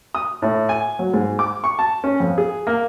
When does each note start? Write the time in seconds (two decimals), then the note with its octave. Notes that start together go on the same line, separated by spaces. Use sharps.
0.15 D#6
0.42 A2
0.69 G#5
0.99 F#3
1.14 G#2
1.39 D6
1.64 C#6
1.79 A5
2.04 C#4
2.20 F2
2.38 G#4
2.67 A#3